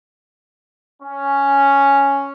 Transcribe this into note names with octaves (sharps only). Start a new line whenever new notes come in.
C#4